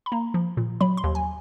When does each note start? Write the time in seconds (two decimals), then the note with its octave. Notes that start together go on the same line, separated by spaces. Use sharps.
0.06 B5
0.12 A#3 A#5
0.34 F3
0.57 A#2
0.81 F#3 B5
0.97 C6
1.04 D#2
1.15 G#5